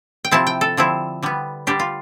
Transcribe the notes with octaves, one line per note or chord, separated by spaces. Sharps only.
G5
C3 F3 C4 E4 A5
G5
A4
D3 F3 C4 E4
D3 G3 B3
D3 G3 D4 G4
F4